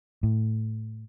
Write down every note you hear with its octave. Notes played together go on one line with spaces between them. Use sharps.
A2